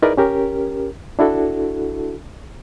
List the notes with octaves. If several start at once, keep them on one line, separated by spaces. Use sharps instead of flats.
D#4 E4 G#4 A#4 B4 D5
C#4 G4 A#4
D4 E4 F#4 A4